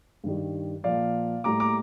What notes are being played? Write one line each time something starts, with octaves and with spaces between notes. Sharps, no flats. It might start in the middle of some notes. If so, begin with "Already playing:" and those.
G2 D#3 G3
A#2 F3 A#3 D5 F5
A2 G3 A#3 A#5 D6
A#5 D6